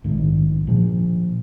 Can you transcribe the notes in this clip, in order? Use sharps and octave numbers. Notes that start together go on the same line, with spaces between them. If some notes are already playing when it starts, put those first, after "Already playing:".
A#1 G#2 D#3
A#2 F3